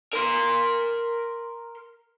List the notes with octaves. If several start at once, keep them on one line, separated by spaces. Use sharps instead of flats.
A#4 C6